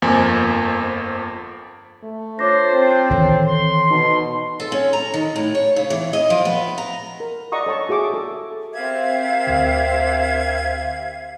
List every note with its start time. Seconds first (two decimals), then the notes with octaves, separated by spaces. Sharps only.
0.02 G1 F2 F3 A#3 G#5
2.03 A3
2.39 D4 F4 C5 C#5 D6 A#6
2.74 C4
3.10 D#3 E3 A4 C#5
3.47 C6
3.91 B2 D#4 A5
4.60 A4
4.72 C#4
4.93 A#5
5.14 D#3
5.36 A2
5.55 C#5
5.76 C#3
5.90 E3
6.13 D#5
6.30 F3
6.45 B3
6.78 A#5
7.20 A#4
7.52 D5 D#5 F#5 A#5 C#6 D#6
7.66 A4 C#5 A5 C#6
7.89 F#4 G#4 E5 D6
8.14 A4
8.73 C4 G4 A#4 E5 F5 G#6
9.47 D2 D3